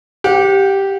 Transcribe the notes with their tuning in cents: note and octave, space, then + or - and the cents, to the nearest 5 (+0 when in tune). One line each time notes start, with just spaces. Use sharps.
G4 -5 F#5 -30